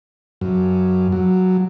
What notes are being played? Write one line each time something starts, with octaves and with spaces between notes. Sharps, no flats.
F#2
F#3